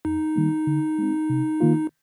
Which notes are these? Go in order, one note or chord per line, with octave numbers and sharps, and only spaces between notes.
F2 D#4
D#3 G3 A#3
D3
G#3 C4
C3
D#3 A#3 F4